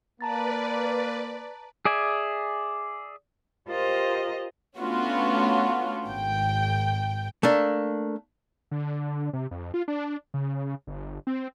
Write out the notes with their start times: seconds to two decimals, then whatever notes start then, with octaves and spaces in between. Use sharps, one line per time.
0.21 A#3 B4 D5 A5 A#5 A6
1.85 G#4 D5 E5 G#5
3.69 F4 G4 A#4 C5 D#5
4.79 A3 B3 C#4 D4 F4 F#4
6.07 G#1 G5
7.43 A3 A#3 D4
8.71 D3
9.33 C3
9.51 F2
9.74 F4
9.88 D4
10.34 C#3
10.87 G1
11.27 C4